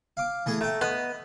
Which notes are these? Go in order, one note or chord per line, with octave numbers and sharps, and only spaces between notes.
F5 D6
E3 A3 G#4
A3 G5 A#5
B3 D#5